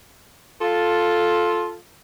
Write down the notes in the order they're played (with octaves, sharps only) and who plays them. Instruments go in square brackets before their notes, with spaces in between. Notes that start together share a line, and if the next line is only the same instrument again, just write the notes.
[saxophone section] F4 A4